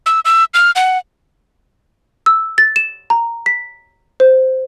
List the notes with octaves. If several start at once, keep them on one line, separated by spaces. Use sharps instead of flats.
E6
E6
F6
F#5
E6
A6
E7
A#5
B6
C5